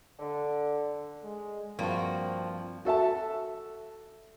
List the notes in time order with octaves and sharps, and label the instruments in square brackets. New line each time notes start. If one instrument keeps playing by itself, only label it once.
[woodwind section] D3
[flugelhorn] G#3
[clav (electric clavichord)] G2 G#5 [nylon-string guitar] F3 [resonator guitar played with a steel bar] A#3 F#4 [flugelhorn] C4
[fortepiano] F#4 A4 E5 A5